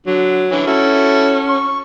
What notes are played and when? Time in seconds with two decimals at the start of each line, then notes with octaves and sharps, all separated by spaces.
0.06 D3 F#3
0.51 D3 E3 C#4
0.67 C#4 E4 F#4 A4
1.49 C#6